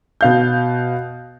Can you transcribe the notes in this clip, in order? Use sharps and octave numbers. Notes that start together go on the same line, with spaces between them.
B2 F5 G6